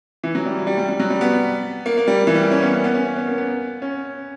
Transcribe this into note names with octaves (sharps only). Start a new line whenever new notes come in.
E3
F#3
G3
G3
G3
G3
F#3
G3
B3
A#3
A#3
G3
E3
G3
A#3
C#4
B3
A#3
B3
C#4
C#4
B3
A#3
B3
C#4